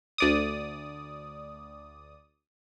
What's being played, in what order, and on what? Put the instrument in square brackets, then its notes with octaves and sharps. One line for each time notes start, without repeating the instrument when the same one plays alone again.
[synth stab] D2 D5 D#6